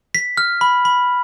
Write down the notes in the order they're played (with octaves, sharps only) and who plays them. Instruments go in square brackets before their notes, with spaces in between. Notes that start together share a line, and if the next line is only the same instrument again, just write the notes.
[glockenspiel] B6
F6
B5
B5